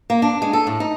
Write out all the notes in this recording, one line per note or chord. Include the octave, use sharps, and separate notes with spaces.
A#3
D4
G#3
A4
A2
D#4